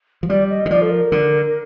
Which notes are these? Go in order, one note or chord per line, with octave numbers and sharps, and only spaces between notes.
F3
G3 D5
D#5
D#3
F3 D5
A4
A#4
D3